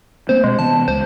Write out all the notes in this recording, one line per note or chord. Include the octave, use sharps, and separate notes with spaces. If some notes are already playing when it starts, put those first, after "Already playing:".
A3 A#3 C4 C5
B2 G#3 C4
C3 E3 B3 A5
C#2 G#3 C5